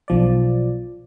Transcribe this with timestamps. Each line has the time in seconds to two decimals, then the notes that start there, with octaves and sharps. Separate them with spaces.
0.08 B1 F3 D5